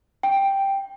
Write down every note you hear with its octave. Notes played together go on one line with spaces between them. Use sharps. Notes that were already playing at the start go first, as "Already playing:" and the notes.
G5